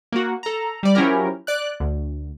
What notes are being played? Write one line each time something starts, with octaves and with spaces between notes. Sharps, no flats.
A#3 F#4
A4 A#5
G3 D5
F3 F#3 C#4 E4 G4 A#4
D5 F#6
D2